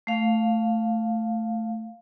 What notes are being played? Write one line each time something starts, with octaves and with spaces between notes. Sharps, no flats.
A3 F5